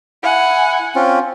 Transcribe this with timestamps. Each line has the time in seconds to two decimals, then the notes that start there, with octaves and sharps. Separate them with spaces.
0.23 E4 F#5 G#5
0.95 C4 C#4 F4